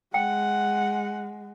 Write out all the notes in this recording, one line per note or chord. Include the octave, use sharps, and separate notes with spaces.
G#3 F#5 G5